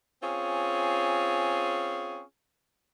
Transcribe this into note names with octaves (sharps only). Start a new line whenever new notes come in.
C4 C#4 F4 G#4